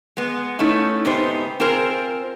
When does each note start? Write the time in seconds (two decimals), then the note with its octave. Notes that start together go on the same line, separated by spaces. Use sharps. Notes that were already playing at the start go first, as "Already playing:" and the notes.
0.17 G#3 B3
0.59 A3 C#4 D#4 E4
1.05 G#2 C3 B3 D#4 G4 C5
1.60 C4 F4 G#4 A#4 C5